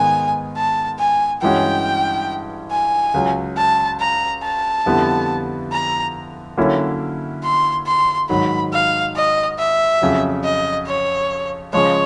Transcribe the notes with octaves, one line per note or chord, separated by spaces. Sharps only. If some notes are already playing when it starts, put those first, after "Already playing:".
Already playing: G#2 D#3 G#3 B3 G#5
A5
G#5
G2 E3 G#3 C#4 F#4 G5
G#5
C#2 C#3 F#3
A5
A#5
A5
F2 D3 G3 B3 E4
A#5
D3 F#3 A#3 C#4 E4
C6
C6
G#2 D#3 F#3 B5
F5
D#5
E5
F2 C#3 F#3
D#5
C#5
C#3 F3 G#3 C#5